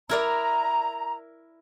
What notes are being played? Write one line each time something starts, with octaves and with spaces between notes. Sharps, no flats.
E4 A#4 D5 A#5